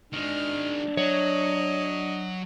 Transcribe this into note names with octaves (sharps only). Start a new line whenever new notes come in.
D#3 G#3 D4 F6
F#3 C#5 D#5